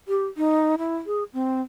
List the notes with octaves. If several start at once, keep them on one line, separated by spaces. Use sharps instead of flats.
G4
D#4
E4
G#4
C4